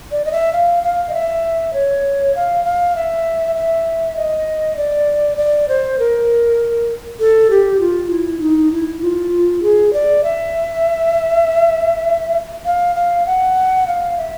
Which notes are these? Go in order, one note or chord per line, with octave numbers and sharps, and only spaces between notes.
D5
D#5
E5
F5
F5
D#5
E5
C#5
F5
F5
E5
E5
D#5
D5
D5
C5
A#4
A4
G4
F4
E4
D#4
E4
F4
G#4
D5
E5
F5
F5
F#5
F5
E5